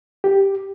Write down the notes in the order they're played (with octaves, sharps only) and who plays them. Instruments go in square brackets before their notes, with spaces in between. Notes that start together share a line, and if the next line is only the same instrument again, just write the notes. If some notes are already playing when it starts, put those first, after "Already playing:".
[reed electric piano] G4